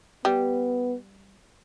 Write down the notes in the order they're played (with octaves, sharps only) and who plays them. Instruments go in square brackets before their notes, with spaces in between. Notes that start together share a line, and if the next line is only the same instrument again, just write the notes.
[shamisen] G3 [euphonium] B3